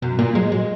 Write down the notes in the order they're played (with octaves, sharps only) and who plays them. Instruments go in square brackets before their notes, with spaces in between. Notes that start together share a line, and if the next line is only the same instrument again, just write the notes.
[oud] F#2 [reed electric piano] B2
[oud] A#2 [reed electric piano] A#3
[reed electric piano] F#3 [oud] G#3
[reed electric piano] F#3 [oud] G#3